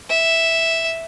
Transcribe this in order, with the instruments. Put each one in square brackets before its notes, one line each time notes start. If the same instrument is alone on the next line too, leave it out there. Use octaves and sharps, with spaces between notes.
[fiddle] E5